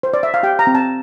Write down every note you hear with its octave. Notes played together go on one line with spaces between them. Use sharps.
C5
D5
E5
F5
G4 G5
A#5
C4
A5